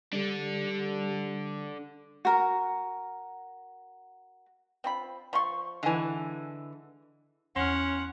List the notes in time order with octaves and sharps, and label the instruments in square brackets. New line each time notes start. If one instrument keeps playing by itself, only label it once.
[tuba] G3 [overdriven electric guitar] D4 A4
[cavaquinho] F#4 A#4
[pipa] C4 F4 B5
F3 C6 C#6
[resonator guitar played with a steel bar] D3 E3 [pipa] G#3 G#5
[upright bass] E2 D4 [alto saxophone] C#4 [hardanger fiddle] F#5 [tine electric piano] C6 F6